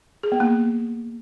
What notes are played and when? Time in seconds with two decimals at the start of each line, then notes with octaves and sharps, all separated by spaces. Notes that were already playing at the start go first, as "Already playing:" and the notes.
0.23 G#4
0.32 B3
0.40 A#3